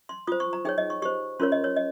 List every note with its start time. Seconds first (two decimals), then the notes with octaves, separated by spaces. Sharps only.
0.09 C6
0.27 F4 C5 D#6
0.40 C#6
0.53 A#5
0.65 D#4 G#4 C#5 G5
0.78 D#5
0.90 C#6
1.02 G4 C5 C#6
1.40 C#4 F4 A#4 C#5 C6
1.52 D#5
1.64 C#5
1.76 D#5